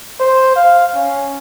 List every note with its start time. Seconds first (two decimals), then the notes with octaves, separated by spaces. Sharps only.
0.20 C5
0.56 F5
0.95 C#4